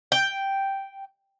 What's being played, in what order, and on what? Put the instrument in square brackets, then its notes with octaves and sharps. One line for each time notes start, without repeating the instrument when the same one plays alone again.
[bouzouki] G5